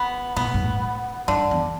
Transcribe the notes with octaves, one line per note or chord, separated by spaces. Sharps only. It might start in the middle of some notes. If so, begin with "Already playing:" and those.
Already playing: B3
B2 B3
A2
G2
A2
G2 D3
E2